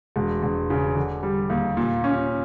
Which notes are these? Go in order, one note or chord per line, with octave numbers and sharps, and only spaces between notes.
E1
E1
C#3
D3
G3
D#2
A#2
C#4